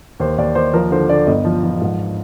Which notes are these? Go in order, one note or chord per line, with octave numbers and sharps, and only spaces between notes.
D#2 C5
D#2 D5
D#2 C5
F3 A#4
D3 C5
D3 D5
G1 D#5
F3
F3
G#2